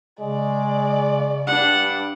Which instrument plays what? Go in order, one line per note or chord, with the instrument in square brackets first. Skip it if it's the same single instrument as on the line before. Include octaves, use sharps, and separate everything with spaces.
[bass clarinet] C#3 [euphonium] G#3 [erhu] D5
[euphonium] G2 [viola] D4 F#5